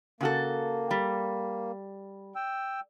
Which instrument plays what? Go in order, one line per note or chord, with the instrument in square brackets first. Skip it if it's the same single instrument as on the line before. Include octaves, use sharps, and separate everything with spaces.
[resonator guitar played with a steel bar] C#3 F#4 A4 [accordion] A#3
[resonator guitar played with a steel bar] G3
[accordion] G5 E6